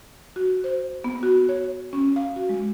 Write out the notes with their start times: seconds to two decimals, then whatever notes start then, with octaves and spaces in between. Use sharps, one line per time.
0.36 F#4
0.64 C5
1.04 B3
1.23 F#4
1.49 C#5
1.93 C#4
2.16 F5
2.36 F#4
2.49 G#3